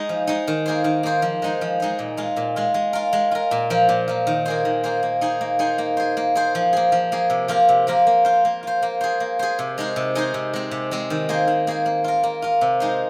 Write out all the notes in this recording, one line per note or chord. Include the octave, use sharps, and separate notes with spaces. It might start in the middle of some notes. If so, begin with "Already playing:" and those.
Already playing: G#3 D#4
F3
G#3 D#4
D#3
A#3 G#4 C5
D#3
A#3 G#4 C5
F3
G#3 D#4 C5
F3
G#3 D#4 C5
A#2
G#3 F4
A#2
G#3 F4
G#3
F4 A#4
G#3
F4 A#4
A#2
F3 A#3
A#2
F3 A#3
D#3
A#3 G#4 C5
D#3
A#3 G#4 C5
A#3
D#4 G#4 C5
A#3
D#4 G#4 C5
A#3
G#4 C5
A#3
G#4 C5
F3
A#3 G#4
F3
A#3 G#4
C3
F3 A#3 F4 A#4
C3
F3 A#3 F4 A#4
A#3
F4 C5
A#3
F4 C5
A#3
G#4 C5
A#3
G#4 C5
C3
G#3 D#4 G#4 C5
C3
G#3 D#4 G#4 C5
C3
G#3 C4
C3
G#3 C4
D#3
A#3 G#4 C5
D#3
A#3 G#4 C5
A#3
F4 A#4
A#3
F4 A#4
C3
G#3 D#4 C5